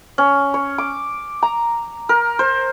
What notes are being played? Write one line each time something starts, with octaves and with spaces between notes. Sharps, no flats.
C#4
C#5
D6
A#5
A#4
C5